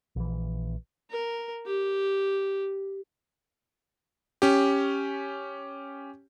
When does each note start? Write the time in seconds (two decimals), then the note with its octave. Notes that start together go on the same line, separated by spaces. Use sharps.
0.16 A#1 E3
1.10 A#4
1.66 G4
4.42 C#4 G4